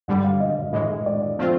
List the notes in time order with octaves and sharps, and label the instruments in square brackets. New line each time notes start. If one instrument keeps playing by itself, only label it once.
[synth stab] G2 D3 G3 [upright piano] F#5
[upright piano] F5
D#5
D#5
[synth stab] A2 E3 G#3 [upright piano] D#5
[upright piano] D5
[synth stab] F3 A3 C4 F4